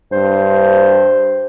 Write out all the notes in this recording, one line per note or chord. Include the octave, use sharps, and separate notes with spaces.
G2 C5